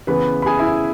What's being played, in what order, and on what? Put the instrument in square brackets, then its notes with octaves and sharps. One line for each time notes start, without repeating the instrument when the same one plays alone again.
[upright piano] C#3 E3 B3 B4 B5
B5
G#4 G#5
E4 E5